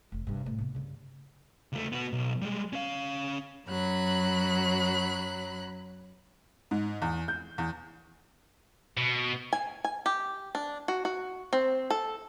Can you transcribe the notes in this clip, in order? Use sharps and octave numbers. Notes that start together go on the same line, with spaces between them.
F1 C3
G2 C3
A2
C3 B3
G2 C#3
C#2 A3
B3 F#4
B1
G3 G#3
C#4 F5
F#2 F#3 B5 F#6
G#2
E2
G6
E2
B2
G#5
G#5
G4
D4
F#4
F#4
C4
A4